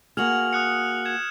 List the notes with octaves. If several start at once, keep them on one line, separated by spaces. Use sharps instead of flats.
A#3 F#4 G#4 F6 F7 F#7
D#6 F#6 C#7
G#6 E7